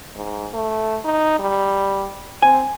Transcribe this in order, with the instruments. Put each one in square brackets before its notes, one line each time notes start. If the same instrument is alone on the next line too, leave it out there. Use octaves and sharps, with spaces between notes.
[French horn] G#2
A3
D#4
G3
[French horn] C4 [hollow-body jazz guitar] G#5